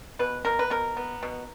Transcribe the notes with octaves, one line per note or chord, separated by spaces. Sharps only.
B2 B4
B2 A#4
B4
B2 A#4
B3
B2